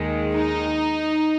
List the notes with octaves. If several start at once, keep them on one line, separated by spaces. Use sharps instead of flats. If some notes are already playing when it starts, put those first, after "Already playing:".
Already playing: D#2 D#3 G#3
D#4